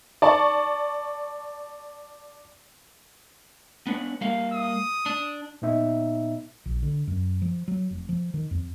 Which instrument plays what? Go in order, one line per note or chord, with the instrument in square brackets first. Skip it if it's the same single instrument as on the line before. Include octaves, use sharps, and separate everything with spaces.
[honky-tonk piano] D5 A5 C#6
[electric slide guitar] B3 D4 C#5
G3 A#3 F5
[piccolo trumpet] D#6
[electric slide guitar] D4
[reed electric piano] A#2 B3 D#4 E5
[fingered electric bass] A#1
D3
F#2
F3
F#3
F1
F3
D#3
F2